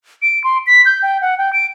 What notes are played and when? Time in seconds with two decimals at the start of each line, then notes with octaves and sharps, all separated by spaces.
0.22 D7
0.44 C6
0.67 B6
0.86 G6
1.02 G5
1.22 F#5
1.38 G5
1.53 D7